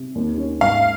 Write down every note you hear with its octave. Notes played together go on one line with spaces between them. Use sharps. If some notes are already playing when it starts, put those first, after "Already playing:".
Already playing: C3
D#2
C#4
G#2 F5